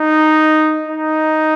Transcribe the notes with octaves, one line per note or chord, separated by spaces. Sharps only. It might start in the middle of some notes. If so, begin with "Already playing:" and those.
Already playing: D#4
D#4